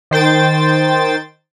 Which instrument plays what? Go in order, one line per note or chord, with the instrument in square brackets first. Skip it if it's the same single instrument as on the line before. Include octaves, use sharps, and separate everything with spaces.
[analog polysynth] D#3 C5 G5 A6